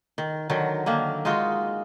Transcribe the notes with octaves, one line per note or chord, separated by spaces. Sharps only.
D#3
D3 D#3 F#3
D3 D#3 A#3
G#3 D#4 F4 F#4